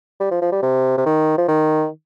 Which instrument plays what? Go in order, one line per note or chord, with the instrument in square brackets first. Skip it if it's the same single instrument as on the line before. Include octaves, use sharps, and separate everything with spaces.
[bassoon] G3
F3
F3
G3
C3
C3
D#3
F3
D#3